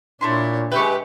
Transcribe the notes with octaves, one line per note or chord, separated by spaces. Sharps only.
A#2 A3 D4 E4 C#5 C6
G#3 G4 B4 E5 G5 C#6